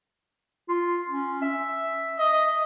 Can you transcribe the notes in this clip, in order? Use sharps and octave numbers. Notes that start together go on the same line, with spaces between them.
F4
C#4
E5
D#5